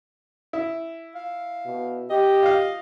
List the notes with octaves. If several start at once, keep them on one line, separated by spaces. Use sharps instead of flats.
E4
F5
B2
G4 D#5
F4 F5